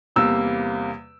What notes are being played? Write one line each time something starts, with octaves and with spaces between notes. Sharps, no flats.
E2 C3 G3 A#3 E6